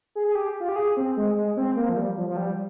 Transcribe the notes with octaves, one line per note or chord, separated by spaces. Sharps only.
G#4
G#4
G4
F4
G4
G#4
C4
G#3
G#3
C4
A#3
F3
G3
F3
F3
G3